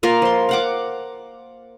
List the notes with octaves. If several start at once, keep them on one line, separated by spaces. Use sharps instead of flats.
A#3 F4 A#4 F5
F3 C6
F5 F#5 D6